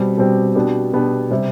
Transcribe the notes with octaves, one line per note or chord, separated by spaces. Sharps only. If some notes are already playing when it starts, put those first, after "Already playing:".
Already playing: B2 G3 C4 G4
B2 G3 C4 G4
B2 B3 D4 G4
B2 B3 D4 G4
C3 G3